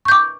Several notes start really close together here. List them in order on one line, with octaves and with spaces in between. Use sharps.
C#6 G6 D6